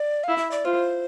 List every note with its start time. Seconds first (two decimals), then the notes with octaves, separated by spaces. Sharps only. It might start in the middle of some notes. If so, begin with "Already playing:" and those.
Already playing: D5
0.24 E4 F5
0.37 E5
0.51 D5
0.65 F4 C5